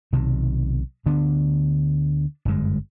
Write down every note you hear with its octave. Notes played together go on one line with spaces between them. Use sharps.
B1 C3 D#3
D2 D3 B3 D4
G1 F#2 G#3